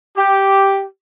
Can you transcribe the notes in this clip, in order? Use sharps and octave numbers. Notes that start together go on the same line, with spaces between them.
G4